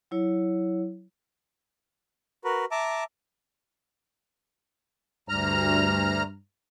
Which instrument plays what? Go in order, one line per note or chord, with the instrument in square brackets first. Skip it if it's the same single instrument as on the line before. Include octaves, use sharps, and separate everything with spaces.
[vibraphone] F#3 E4 C#5
[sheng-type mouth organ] F#4 A#4 B4
E5 A5 A#5 D6
[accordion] D2 A#5 F6 [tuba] G2